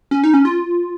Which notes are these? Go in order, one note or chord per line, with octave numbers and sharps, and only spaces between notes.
C#4
D#4
C#4
F4